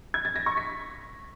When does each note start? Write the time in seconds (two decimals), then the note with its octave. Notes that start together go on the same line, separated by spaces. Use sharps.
0.14 G#6
0.25 A6
0.36 A#6
0.46 C#6
0.57 B6